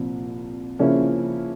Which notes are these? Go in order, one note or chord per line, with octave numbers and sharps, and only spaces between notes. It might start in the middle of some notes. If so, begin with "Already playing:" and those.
Already playing: C2 A#2 F3
C#3 F3 A#3 C#4 E4